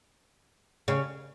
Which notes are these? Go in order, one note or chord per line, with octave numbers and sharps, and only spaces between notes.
C#3